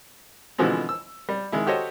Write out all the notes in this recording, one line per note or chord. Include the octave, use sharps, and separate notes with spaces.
B2 D3 E3 F3 G#3 C4
E6
G3
D#3 G#3 E4
F#4 G4 A4 C5 C#5 D#5